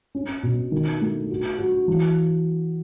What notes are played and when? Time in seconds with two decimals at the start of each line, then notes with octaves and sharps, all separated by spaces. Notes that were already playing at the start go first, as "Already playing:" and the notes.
0.15 C#4
0.43 B2
0.72 D#3
1.01 A3
1.30 F#4
1.58 F#4
1.88 E3